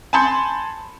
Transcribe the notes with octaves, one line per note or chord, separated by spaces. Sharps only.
G#5 A5 B5 C6 G6 C#7